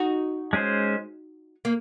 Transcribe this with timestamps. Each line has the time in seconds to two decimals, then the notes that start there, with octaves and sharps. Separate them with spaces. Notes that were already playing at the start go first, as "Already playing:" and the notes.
Already playing: D#4 F#4
0.53 G#3 C#4 G#4 C5
1.65 A#3